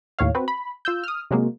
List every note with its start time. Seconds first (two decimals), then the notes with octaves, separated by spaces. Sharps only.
0.19 D#2 A2 C#5 F5
0.35 C4 F#4 B4
0.48 B5
0.85 F4 E6 G6
1.04 D#6 F6
1.31 C3 F#3 G#3 A#3